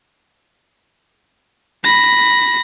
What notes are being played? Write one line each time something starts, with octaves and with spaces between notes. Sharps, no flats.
B5 A#6